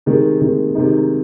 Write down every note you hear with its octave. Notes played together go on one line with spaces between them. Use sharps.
C3 D#3 G#3
C3 D#3 G#3
C3 D#3 G#3 D#4